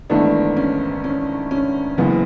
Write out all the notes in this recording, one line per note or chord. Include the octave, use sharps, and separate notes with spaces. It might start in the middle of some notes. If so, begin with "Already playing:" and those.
G#1 G#2 E3 A3 B3 D4
C#4
C#4
C#4
F#1 F#2 E3 B3